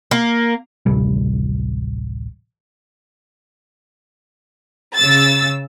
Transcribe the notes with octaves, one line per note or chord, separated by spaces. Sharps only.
A#3
D1 A1 C3 G3
C#3 E6 A6